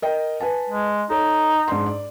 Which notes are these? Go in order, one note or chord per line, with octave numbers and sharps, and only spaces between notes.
A#4 D#5 G5
B4 G#5 A5
G#3
D#4 A4 C#5
G#2 D4 C6
D5